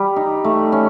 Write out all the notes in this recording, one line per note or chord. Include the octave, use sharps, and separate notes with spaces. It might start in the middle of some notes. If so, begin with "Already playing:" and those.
Already playing: G3
D#4
A3
C#4